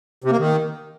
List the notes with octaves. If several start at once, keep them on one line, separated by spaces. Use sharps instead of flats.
C3
A#3
D#3